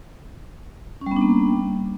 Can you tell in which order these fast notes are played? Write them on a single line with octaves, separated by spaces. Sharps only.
C#4 G3 B3 D4 A#3